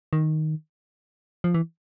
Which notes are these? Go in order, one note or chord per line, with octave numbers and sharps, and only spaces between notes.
D#3
F3
E3